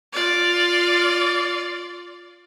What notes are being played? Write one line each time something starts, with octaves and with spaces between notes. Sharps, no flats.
F4 D5